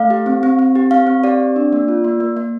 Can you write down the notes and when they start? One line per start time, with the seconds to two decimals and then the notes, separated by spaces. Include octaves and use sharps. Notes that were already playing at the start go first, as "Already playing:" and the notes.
Already playing: A3 F5
0.10 G4
0.26 C4
0.43 C4
0.59 C4
0.75 G4
0.91 C4 F5
1.07 C4
1.24 G4 D5
1.40 C4
1.56 D4
1.73 A#3
1.88 F4
2.04 A#3
2.20 A#3
2.37 A#3